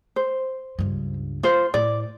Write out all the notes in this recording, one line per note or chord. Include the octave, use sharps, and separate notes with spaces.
C5
C#2 G2
F4 C5
A2 D5